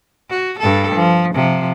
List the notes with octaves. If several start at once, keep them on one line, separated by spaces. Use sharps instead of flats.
F#4
G2 A4
F3
C3 F3